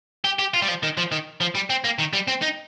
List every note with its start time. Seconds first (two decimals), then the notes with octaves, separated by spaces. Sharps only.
0.24 G4
0.39 G4
0.54 F4
0.62 G3
0.68 F3
0.83 D#3
0.97 F3
1.12 D#3
1.41 F3
1.55 G3
1.70 C4
1.84 A#3
1.99 D#3
2.13 G3
2.28 C4
2.42 D#4